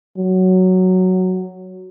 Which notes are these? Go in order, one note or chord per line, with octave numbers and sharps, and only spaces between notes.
F#3